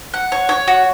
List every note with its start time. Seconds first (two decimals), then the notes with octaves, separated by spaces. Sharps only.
0.14 F#5
0.32 C#5
0.49 C#5
0.68 F#4